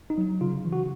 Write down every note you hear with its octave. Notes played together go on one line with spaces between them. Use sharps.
D#4
F#3
C#3 F4
E3
F#4